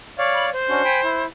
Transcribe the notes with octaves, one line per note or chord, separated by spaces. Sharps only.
C#5 D5 F5
B5
C5
C#4 D4 F#4
G5 G#5 B5
E4